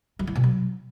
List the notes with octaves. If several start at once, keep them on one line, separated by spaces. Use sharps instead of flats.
F#3
E3
B2
F#3